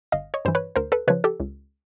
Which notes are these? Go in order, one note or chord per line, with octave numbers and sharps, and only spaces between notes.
G1 D#5 F5
C#5 D#5
G2 E3 C5
B4 C#5
D2 A#4 C5
A4 B4
C#3 F3 B4 C#5
G4 A4
C#2